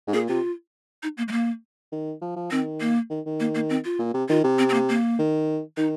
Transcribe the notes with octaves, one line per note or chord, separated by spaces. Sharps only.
G#2
A#2 G#4
C3 F4
D#4
A#3
G#3
A#3
D#3
F3
F3
D#3 C4
A#3
D#3
D#3
A#3
A#3
C4
F4
A#2
C3
D#3 F4
C3
C4
C4
A#3
A#3
D#3
D#3 D#4